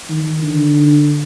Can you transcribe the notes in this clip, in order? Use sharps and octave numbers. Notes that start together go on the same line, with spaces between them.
D#3
D3